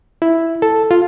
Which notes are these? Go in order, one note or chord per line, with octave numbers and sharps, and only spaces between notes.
E4
A4
F4